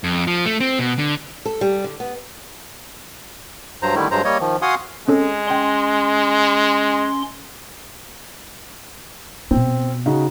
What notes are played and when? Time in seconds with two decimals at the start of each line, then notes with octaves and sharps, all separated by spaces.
0.04 F2
0.27 F3
0.46 A3
0.60 C4
0.79 B2
0.98 D3
1.46 A4
1.61 G3
1.84 D3
2.00 B3
3.82 G2 F#3 C5 A#5
3.95 D3 D#3 G3 A3 E4
4.11 G2 F#3 G#3 C5 A#5
4.25 G3 A#3 C#5 D#5
4.40 D#3 F3
4.62 F#4 F5 F#5 G#5 C6 D#6
5.08 G#3 C4 C#4 A4
5.47 C#4 D#5 G5 C6
9.51 B2 B3 C4
10.06 C#3 D#4 F#4